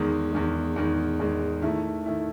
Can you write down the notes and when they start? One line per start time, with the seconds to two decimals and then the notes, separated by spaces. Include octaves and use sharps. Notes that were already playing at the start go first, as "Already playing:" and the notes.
Already playing: E2 D#3 G#3
0.32 E2 D#3 G#3
0.76 E2 D#3 G#3
1.19 E2 D#3 G#3
1.62 D#3 A3 E4
2.06 D#3 A3 E4